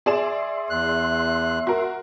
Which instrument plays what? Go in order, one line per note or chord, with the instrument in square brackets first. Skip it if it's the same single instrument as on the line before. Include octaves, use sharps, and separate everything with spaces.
[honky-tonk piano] G#4 D5 E7 [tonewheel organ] E5 C6
[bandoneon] E2 F#6
[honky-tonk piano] F#4 A#4